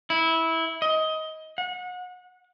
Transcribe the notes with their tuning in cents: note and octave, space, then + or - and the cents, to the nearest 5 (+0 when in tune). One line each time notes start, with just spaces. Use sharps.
E4 -15
D#5 +20
F#5 -30